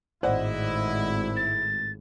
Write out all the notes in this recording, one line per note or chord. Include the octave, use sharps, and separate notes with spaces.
G#1 A2 E4 C5 D5 D#5 F#5
A6